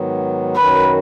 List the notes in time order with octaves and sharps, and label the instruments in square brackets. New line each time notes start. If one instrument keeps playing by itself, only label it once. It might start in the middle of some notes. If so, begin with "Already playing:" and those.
Already playing: [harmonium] G#2 D#3 F#3 B3
[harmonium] F#2 D#3 F#3 [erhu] B4